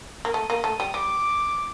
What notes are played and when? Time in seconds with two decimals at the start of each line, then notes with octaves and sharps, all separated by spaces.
0.25 A#3
0.34 A3 D#6
0.50 A#3
0.64 A3
0.80 G3
0.94 G3 D6